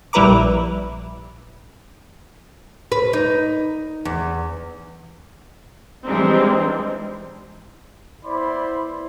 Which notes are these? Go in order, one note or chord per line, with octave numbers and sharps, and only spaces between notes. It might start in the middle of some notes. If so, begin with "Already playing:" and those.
A#1 G3 E4 B4 A#5 D6
B4
D#4
E2
E3 G3 G#3 C4 D4 D#4
B3 E4 C5 D5 B5 C6